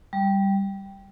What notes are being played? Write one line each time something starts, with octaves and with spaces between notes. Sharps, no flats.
G3